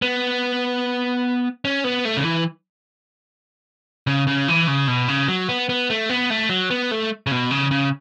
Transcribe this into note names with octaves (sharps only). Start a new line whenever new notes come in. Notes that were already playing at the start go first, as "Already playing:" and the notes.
B3
C#4
B3
A3
C#3
E3
C#3
C#3
E3
C#3
B2
C#3
F#3
B3
B3
A3
B3
A3
F#3
B3
A3
C#3
B2
C#3
C#3